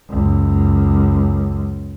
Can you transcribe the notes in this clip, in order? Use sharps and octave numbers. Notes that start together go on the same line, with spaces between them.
C#2 F#2